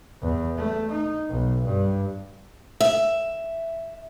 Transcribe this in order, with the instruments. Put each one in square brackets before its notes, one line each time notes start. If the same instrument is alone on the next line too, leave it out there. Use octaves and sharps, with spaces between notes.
[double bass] E2
A3
D#4
B1
G2
[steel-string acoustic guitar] E5